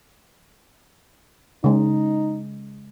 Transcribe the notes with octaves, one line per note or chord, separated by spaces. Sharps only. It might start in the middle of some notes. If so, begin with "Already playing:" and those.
C#3 G#3 D#4